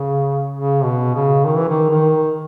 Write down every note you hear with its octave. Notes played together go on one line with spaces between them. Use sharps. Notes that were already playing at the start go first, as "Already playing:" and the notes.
Already playing: C#3
C#3
B2
C#3
D#3
E3
D#3
D#3